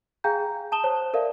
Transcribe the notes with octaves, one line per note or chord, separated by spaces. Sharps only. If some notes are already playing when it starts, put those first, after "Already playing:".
G#4 F5 G5 G#5 A#5 G6
A5 D#6 E7 G7
C5 C#5 A5
A4 A#4 D5 E5 F5